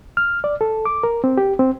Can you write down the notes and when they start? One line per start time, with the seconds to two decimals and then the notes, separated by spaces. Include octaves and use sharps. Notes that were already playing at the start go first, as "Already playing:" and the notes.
0.17 F6
0.44 D5
0.61 A4
0.85 D6
1.03 A#4
1.24 C4
1.38 G4
1.59 C4